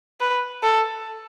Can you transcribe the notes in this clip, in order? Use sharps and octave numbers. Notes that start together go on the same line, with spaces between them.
B4
A4